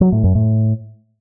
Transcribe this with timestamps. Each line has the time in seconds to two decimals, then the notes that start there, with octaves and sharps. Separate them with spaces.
0.01 F#3
0.12 A2
0.24 F#2
0.35 A2